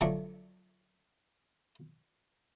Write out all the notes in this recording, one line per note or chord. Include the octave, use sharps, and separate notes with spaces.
D3 F3 F#3 A3 D4